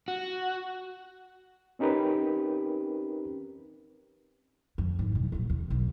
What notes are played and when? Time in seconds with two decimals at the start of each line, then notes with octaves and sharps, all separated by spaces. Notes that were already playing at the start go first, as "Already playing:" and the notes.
0.08 F#4
1.79 C4 C#4 D#4 G4 A#4 B4
4.78 F2
4.99 G#1
5.15 B1
5.32 A1 A#2
5.50 E2
5.70 B1